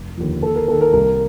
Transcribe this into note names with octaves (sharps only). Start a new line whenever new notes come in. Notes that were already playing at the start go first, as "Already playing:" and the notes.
Already playing: F1
D#2 D3 F3
D#2 A4
A#4
D#3 A#3 A4
A#4
C2 A#4